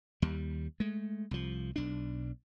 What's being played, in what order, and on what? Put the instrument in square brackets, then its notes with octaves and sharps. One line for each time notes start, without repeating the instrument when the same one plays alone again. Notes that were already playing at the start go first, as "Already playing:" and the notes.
[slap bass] D#2 G3
G#3 A3
C2 F3
B1 D4